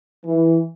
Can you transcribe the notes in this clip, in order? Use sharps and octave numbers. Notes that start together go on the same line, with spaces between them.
E3